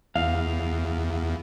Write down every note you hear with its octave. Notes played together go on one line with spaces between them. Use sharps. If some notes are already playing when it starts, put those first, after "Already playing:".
E2 F5